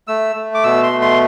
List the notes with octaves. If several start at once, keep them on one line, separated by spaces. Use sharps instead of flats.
A3 E6
A3
D6
B2 E6
C6
A3
C6